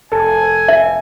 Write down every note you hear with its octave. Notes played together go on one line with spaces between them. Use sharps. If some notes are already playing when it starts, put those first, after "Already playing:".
F1 A4 G#5
E5